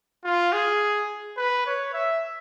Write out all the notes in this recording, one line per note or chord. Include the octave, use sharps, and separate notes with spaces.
F4
G#4
B4
C#5
E5